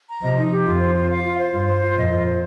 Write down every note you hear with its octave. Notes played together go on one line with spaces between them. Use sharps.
A#5
C3 F3 D#5
D#4
G4
F2 F4
C5
F4
F5
F4
C5
G2 F4
C5
F4
F2 A#2 D#5
F4
C5